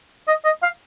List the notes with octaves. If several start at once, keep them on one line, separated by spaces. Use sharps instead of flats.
D#5
D#5
F5